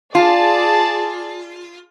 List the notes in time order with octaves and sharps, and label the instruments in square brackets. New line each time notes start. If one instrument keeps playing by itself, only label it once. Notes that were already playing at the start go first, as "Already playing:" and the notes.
[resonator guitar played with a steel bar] F4 [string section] G#4 D5 A5